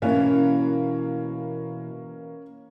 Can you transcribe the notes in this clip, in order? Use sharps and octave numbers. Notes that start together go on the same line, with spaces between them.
B2 E3 A#3 C#4 F5